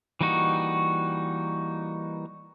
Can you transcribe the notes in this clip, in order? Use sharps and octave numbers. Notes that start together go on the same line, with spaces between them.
E3 G3 A#3 D#4 F#4